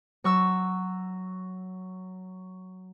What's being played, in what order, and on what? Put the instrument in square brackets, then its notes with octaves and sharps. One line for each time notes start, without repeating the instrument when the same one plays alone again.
[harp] F#3 C#6 E6